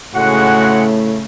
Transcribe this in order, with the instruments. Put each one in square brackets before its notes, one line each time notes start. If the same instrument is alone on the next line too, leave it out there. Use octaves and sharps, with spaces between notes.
[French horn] A2 [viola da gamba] C#3 A3 [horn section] G#3 F#5 [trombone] F#4